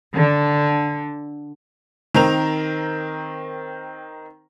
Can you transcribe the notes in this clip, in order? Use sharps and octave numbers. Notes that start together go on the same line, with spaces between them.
D3
D#3 C4 A#4 F7